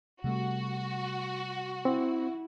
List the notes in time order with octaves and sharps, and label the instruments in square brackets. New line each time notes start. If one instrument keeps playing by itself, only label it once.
[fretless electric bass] C3 G3 A3 [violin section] F#4
[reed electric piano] C4 [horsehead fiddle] E4